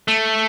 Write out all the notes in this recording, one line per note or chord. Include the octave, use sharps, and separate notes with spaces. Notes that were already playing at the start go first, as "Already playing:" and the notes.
A3